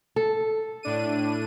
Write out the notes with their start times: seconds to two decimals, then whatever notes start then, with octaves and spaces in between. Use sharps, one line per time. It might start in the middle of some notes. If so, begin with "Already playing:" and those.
0.16 A4
0.83 A2 D4 D#7